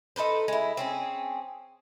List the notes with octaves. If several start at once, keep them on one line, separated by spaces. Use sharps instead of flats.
D#4 A4 B4 C5
G#3 E4
C4 C#4 G#4